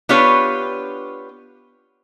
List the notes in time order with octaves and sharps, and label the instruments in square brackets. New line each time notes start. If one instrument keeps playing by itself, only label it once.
[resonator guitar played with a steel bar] B3 D4 F4 G4 B4 C#5